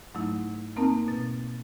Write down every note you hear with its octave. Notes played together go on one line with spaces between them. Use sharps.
G#2 F#3 A3 D#4 E4
A#3 C4 D#4 A#4 A5
B2 A6